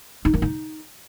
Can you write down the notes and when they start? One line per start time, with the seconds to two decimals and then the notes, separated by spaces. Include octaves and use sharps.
0.25 D#4
0.34 D#3
0.42 D#4